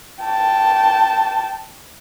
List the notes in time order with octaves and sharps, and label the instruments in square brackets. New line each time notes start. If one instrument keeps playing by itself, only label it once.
[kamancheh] G5 A5